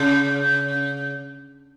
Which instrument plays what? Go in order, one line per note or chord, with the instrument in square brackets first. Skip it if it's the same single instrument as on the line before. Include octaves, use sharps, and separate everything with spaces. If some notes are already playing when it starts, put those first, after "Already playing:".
Already playing: [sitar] C#3